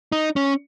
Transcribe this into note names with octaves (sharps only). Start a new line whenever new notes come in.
D#4
C#4